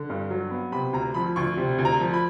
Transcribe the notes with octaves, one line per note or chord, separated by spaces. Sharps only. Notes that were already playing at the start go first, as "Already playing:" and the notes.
Already playing: D3
G2
F#3
B3
C3 B5
D2 A#5
F3 B5
D2 C#6
C3
D2
A#5
F3
B5